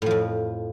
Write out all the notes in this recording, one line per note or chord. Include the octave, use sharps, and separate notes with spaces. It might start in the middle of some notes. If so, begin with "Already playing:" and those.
F2 A2 F3